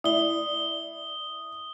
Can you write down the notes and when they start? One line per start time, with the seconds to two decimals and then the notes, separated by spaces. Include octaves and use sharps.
0.04 E4 D5 D#6 G7